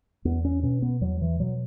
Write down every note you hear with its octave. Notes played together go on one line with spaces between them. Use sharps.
E2 B3
C#4
B2 C#4
B3
E2 F#3
E3
B2 F#3